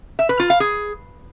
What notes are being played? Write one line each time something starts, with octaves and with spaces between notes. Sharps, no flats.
E5
B4
F4
F5
G#4